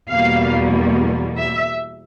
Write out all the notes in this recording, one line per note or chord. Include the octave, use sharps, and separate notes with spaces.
E2 B2 G3 A#3 F5
E5